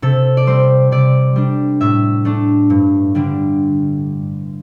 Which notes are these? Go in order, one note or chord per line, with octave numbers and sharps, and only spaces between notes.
C3 A4
D5
G3 C4 C5
C3 D5
G3 D4
A2 E5
A3 D4
G2
D3 G3 D4